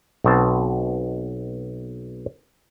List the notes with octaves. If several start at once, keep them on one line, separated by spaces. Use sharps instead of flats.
B1 B2 C4 A5